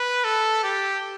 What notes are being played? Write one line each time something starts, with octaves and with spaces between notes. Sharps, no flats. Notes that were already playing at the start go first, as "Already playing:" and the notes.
Already playing: B4
A4
G4